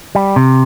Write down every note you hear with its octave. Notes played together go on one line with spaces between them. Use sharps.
G3
C3